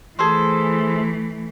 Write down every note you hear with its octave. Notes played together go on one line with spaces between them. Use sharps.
E3 A3 G#4 A4 C5